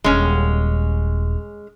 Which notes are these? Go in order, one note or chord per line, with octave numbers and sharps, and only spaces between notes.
D#1 G#3 C#4